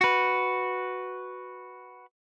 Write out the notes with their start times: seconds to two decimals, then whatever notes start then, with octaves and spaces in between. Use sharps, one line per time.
0.01 F#4 B4